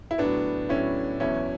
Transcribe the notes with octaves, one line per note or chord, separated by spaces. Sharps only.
E4
A2 F#3 B3 D4
A2 F#3 C#4 E4
E2 B2 F#3 C#4 E4